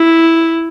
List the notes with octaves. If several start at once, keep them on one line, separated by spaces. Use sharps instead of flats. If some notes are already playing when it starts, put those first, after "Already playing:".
Already playing: E4